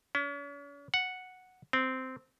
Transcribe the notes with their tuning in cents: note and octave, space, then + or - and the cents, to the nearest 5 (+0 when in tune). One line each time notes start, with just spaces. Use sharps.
C#4 +40
F#5 -5
C4 -10